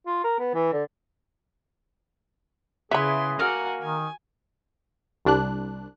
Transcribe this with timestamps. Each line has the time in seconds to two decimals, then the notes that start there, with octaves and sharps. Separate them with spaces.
0.07 F4
0.24 A#4
0.39 B3
0.54 E3
0.73 D3
2.91 C#3 B3 E4 G#4 B4 E5 B5 C6
3.39 A#3 F#4 F#5 G#5 A#5 F6
3.81 D#3 G#5
5.25 C2 D4 F#6